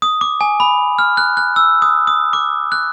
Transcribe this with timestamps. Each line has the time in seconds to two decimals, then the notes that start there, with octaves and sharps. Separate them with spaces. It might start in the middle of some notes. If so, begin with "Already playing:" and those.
0.02 D#6
0.21 D6
0.41 G#5
0.60 B5
0.99 F6
1.17 F#6
1.37 F#6
1.56 E6
1.82 D#6
2.07 D#6
2.33 D6
2.72 F#6